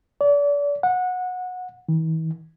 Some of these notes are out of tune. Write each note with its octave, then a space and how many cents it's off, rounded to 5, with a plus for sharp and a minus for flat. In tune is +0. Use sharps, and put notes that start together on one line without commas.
D5 -35
F#5 -20
E3 -45